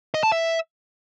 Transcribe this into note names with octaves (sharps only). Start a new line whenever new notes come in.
D#5
A5
E5